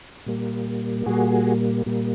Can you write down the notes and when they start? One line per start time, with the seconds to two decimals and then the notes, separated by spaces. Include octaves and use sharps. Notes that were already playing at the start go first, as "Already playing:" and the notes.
0.26 A#2 G3 A#3
1.06 A#2 G3 A#3 F#4 G#4
1.86 A#2 G3 A#3